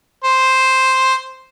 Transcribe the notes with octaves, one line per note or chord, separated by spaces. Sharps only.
C5